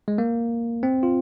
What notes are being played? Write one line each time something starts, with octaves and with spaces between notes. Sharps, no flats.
G#3
A#3
C4
F4